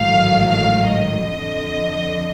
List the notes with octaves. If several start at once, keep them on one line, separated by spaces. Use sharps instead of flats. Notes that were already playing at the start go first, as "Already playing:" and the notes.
Already playing: A1 G#2 D#3 F#3 A3 F5
F5
D#5
F2 D3 F3